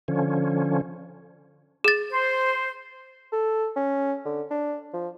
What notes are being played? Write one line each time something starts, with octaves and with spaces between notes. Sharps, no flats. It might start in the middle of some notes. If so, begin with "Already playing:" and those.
D3 F3 C#4
G#4 A6
C5
A4
C#4
D3
D4
F3